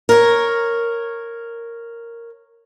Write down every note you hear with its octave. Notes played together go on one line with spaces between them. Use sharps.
A#4 C#5